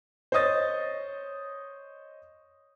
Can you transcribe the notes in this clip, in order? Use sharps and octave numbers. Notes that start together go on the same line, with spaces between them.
C5 C#5 D#5 D#6 A6